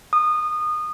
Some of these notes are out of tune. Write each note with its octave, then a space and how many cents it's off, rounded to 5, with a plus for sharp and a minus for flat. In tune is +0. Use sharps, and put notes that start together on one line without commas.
D#6 -25